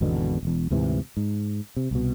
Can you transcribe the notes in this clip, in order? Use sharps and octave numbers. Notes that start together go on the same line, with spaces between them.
G#1 E2 B2 D3
E1 E2
D2 G#2 C3 E3
G#2
C3
C2 B2